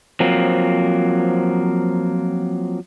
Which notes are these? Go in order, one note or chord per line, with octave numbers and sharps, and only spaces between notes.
F3 F#3 A#3 C4